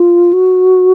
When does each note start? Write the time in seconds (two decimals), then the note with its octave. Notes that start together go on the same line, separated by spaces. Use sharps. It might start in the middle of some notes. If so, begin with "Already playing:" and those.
Already playing: F4
0.33 F#4